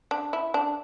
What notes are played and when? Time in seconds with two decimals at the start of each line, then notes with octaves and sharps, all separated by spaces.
0.11 D4
0.33 E4
0.54 D4